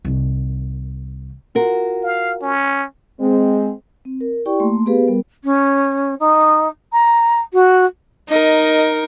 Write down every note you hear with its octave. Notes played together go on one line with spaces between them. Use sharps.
C2 D#3
F4 F#4 A#4
F5
C#4
G#3 C4
C4
A#4
E4 G4 D5 G5 C#6
A3 A#3 C6
B3 G4 G#4 B4 F5
G3 B3 A#4
C#4
D#4
A#5
F#4
D#4 A#4 D#5